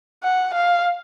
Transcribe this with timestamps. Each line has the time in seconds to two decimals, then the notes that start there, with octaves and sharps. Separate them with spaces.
0.23 F#5
0.54 F5